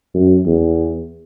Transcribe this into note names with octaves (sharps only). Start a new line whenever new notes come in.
F#2
E2